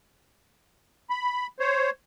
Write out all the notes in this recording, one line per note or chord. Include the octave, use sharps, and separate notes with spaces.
B5
C5 C#5